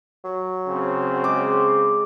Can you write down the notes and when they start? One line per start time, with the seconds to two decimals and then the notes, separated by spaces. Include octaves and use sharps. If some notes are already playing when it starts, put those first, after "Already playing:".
0.24 F#3
0.68 C#3 C4
1.24 G#3 D6